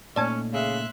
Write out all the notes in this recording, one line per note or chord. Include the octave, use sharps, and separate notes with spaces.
A#2 A3 C#4 D#4 D5 A5 G#6
C#3 E5 C6 F#6